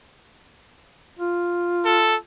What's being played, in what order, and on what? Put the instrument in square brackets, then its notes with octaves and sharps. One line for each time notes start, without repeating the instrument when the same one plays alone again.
[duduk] F4
[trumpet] A4